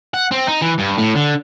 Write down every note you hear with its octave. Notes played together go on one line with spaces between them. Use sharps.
F#5
C4
D#4
E3
G2
A2
D3